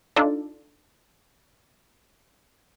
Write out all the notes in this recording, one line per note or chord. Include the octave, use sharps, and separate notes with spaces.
D4 D#4 F4 A4 D5